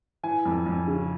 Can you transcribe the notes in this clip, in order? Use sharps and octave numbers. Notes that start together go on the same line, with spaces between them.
E3 G#5
F2
F2
C#3